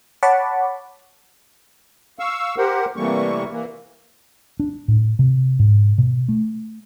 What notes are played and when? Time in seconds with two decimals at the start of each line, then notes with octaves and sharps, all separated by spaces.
0.23 C#5 F#5 A5 B5 C#6 D6
2.19 F5 C#6 E6
2.58 G4 A#4 C5 F#5
2.97 C3 E3 G3 A3 A#3 C#6
3.52 E3 A#3
4.60 D4
4.88 A2
5.19 C3
5.59 G#2
5.98 B2
6.28 A3